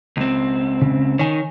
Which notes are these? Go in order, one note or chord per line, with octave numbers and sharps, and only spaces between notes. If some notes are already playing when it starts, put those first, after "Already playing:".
C#2 C4
C#3
D#3 C#5 G#5